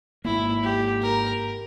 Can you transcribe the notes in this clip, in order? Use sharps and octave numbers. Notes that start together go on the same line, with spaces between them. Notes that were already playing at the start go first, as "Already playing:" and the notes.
G#1 G#2 F3 A#3 E4
G4
A#4